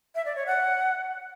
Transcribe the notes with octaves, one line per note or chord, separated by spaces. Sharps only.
E5
D5
C#5
F#5